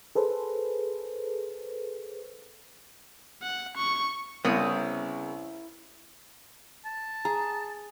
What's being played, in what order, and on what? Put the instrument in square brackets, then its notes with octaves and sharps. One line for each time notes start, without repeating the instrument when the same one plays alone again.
[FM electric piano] G#4 A4 B4 C5
[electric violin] F#5
C#6
[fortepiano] C2 [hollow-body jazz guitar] C#3 B3 [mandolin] C4 C#5 D#6 [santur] E4 A#4
[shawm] A5
[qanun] G#4 [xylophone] A#5